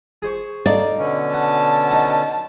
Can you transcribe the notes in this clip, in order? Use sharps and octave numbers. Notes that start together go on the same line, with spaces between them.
G#4 C5 C#6
D#4 A4 D5 F5
B2 D3 C#4
F#5 A5
D#4 F#5